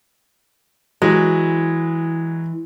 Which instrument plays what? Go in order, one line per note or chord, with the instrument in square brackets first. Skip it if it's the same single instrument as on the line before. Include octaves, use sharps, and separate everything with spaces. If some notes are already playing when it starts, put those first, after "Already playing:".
[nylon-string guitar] E3 [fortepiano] F#3 G#3